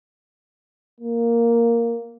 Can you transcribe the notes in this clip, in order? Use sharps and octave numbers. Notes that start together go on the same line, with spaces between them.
A#3